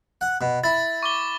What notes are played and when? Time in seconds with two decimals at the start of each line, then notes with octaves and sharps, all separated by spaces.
0.21 F#5
0.41 B2
0.64 E4 A6
1.03 C#6 D6 G7